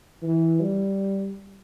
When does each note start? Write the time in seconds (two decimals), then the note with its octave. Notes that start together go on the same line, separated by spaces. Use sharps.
0.22 E3
0.61 G3